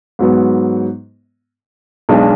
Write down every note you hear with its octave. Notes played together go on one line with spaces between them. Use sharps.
G#2 F#3 B3
B1 B2 G#3 D4